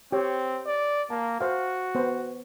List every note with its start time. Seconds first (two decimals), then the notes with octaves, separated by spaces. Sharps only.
0.12 C4 G4 C#5
0.66 D5
1.10 A#3 A5
1.41 F#4 C5 F5
1.95 B3 C5